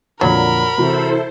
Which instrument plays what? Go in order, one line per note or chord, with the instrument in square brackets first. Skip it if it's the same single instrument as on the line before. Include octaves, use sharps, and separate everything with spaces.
[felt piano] F2 A#2 D3 [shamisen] F#3 [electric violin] A#4 B5
[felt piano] C3 E3 F#4 [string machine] E4 A4 C5